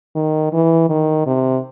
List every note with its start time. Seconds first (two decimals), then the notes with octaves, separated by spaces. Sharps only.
0.15 D#3
0.53 E3
0.89 D#3
1.26 C3